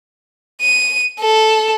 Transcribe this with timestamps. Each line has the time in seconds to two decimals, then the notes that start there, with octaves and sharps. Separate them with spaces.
0.62 D#7
1.19 A4